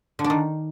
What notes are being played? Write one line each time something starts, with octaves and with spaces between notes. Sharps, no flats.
D3
D4
D#3